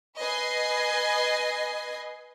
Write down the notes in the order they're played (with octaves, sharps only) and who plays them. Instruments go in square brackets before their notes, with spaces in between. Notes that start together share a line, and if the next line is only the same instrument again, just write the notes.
[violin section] B4 D#5 G#5 C7